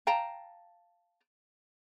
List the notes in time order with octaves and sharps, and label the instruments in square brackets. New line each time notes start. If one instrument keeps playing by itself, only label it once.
[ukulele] F5 G5 A5 A#5